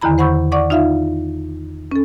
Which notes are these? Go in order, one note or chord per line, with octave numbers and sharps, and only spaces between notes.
E2 D3 D#3 E4 A#5 B5
C5 F#5 B5 C#6 E6 G6
D5 F#5 C#6 D6
D#4 F4 E5 F5
C#4 A4